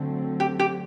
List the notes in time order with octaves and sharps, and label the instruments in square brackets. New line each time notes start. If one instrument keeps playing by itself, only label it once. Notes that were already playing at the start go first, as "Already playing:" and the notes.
Already playing: [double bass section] D3 F#3 A3 C4
[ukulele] G4
G4